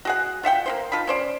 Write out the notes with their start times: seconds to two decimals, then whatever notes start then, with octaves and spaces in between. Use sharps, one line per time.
0.05 F#4 G#4 F#5
0.43 F4 E5 F#5 G5
0.66 A#3 E4 C5
0.92 D#3 F4 A5 B5
1.07 C#4 C5 D5